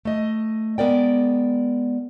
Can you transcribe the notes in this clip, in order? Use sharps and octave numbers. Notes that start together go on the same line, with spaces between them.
A3 D#5
G#3 B3 A#4 D5 G5